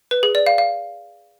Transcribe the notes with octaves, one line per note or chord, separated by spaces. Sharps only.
B4
G#4
D5
F5
F5